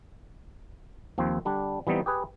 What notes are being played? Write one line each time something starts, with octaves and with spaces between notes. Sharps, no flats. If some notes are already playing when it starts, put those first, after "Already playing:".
D#2 F3 C4
D3 G3 D4
E3 G3 B3 C4 D#4
G4 G#4 B4